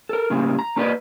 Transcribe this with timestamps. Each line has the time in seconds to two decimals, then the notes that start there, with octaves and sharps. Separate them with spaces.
0.09 A4 A#4
0.30 A2 C#3 G3 A#3
0.59 A#5
0.76 A#3 C#4 F#4 B4 D5 D#5